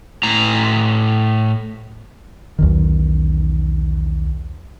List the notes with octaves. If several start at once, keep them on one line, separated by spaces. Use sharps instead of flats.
A2 A#5
B1 E2 D#3